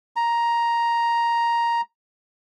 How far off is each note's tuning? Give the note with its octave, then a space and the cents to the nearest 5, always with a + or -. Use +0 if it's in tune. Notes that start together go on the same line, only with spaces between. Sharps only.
A#5 +5